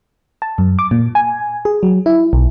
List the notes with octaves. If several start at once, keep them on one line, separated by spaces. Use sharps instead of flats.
A5
F#2
D6
A#2
G#5
G#4
F#3
E4
B1